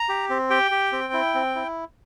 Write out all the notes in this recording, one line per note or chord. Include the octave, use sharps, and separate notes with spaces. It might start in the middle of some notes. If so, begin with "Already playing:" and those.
Already playing: A#5
G4
C4
G4 G5
G4
C4
E4
C4
E4